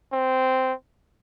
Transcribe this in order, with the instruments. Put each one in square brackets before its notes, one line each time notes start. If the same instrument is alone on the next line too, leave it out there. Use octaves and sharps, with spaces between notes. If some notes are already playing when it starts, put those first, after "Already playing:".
[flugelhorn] C4